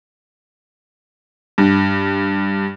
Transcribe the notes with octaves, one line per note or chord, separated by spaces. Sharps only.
G2